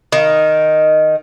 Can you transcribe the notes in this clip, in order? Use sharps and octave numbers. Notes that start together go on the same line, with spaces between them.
D#3